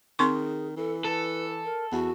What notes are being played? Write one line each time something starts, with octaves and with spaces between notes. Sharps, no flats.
D#3 C4 G#4 C6 C#6
E3 A4
A4 B4
A#4
E2 F#4